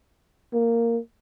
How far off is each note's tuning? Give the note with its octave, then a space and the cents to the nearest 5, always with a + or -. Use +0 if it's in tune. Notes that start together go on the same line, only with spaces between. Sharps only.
A#3 -10